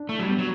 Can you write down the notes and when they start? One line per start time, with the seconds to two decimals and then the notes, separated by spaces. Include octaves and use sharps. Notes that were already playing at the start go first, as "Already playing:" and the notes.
Already playing: D4
0.09 A3 E4
0.19 F#3
0.23 G3
0.28 B3
0.38 F#3